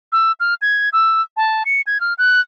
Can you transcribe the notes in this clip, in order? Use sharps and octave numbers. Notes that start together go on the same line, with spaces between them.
E6
F6
G#6
E6
A5
C#7
G#6
F6
F#6